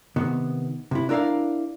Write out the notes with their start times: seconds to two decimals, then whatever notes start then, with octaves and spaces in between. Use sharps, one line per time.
0.16 C3 D#3 B3
0.91 C3 E4
1.09 D4 E4 A#4 D5 F5